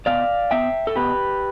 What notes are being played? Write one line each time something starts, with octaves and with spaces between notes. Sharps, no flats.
B2 D5 F5
B3 E5 G5
A4
B2 G4 B4